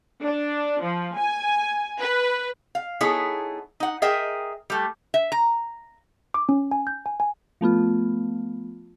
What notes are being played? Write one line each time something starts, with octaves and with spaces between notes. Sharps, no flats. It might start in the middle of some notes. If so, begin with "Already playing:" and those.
D4
F3
G#5
B4
F5
B3 D#4 E4 G#4 A4 C#5
D#4 F#5
G#4 A#4 D#5 E5 G5
G3 A3
E5
A#5
D6
C#4
G#5
G6
G#5
G#5
F3 A3 B3 F4